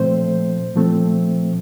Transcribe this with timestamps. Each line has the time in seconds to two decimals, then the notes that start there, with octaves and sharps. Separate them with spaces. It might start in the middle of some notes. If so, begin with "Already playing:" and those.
Already playing: A#2 F3 A3 C4 C5
0.75 A#2 F3 A3 C4